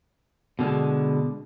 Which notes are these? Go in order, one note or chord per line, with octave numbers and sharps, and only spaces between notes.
B2 D3 G3 G#3